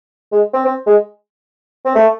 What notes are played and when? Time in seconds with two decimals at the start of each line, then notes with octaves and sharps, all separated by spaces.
0.32 G#3
0.54 C4
0.65 C4
0.87 G#3
1.85 C4
1.95 A3